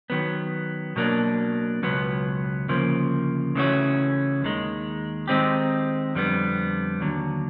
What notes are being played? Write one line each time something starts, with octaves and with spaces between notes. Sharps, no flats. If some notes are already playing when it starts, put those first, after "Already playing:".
D#3 F#3 B3
B2 F#3 A#3 D4
C#2 B2 F#3 B3
D2 C#3 F3 A#3
C#3 E3 A3 C#4 F#4
D#2 D#3 G#3
D#3 G#3 C4 D#4 G4
F2 D3 G3 B3
D#2 D3 F#3